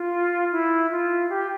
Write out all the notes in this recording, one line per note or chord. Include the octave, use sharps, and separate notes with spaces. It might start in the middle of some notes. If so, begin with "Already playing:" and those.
Already playing: F4
E4
F4
G4